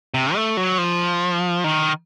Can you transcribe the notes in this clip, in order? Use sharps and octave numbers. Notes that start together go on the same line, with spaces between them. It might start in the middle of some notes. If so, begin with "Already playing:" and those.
C3
A3
F#3
F3
D#3